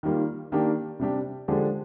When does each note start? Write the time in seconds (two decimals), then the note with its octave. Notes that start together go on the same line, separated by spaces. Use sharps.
0.03 D#3 G3 A#3 F4
0.52 D#3 A#3 D4 G4
0.99 C3 G3 D4 G4
1.48 D3 F3 G#3 D4 G4